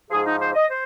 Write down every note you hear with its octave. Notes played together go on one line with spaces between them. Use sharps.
G#2 F3 G#4
D#4
C5
D#5
C5